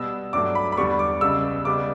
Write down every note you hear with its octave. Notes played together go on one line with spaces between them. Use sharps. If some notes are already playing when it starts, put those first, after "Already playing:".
Already playing: B2 G3 B3 E6
G2 F#3 A3 D6
B5
B5
E2 D3 G3 B3 C#6
D6
C#2 C#3 G3 B3 E6
C#2 C#3 G3 B3 D6